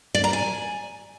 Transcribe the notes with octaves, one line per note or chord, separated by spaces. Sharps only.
D5
A#5
G#5